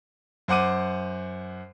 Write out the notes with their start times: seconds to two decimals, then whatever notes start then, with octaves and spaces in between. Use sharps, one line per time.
0.48 F#2 C5 F#5 D6 D#7